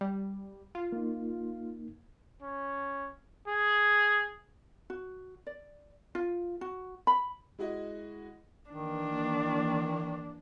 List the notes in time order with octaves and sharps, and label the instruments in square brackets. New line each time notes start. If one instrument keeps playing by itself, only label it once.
[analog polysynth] G3
F4
[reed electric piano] A#3 D#4
[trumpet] C#4
G#4
[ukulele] F#4
D5
F4
F#4
B5
[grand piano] G#3 E4 F#4 D#5
[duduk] D#3 [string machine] E3 A#3 [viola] D4